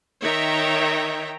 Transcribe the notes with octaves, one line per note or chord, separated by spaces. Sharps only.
D#3 C#5 E5 G5 A#5